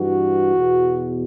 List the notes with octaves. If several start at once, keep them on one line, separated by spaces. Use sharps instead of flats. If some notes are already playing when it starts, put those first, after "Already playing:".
Already playing: G2 E3 F#4
E2 B2